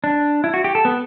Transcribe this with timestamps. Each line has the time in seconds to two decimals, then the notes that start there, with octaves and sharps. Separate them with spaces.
0.04 D4
0.44 E4
0.54 F#4
0.64 G4
0.75 A4
0.85 B3